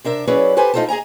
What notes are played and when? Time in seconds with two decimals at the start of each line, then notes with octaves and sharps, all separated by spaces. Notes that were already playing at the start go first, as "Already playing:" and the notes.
0.04 C3 D4 A#4 E5
0.27 F#3 C#4 E4 G#4 B4 D5
0.57 G4 A4 B4 C5 G#5
0.74 A3 D#4 F4 A4 C5 A5
0.89 G#4 D#5 G#5 A#5